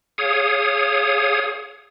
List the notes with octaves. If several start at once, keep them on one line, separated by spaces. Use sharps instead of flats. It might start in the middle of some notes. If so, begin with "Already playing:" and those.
G#4 C#5 F5 D#6